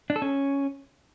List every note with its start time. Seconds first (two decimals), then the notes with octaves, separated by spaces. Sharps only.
0.10 D4
0.16 A4
0.22 C#4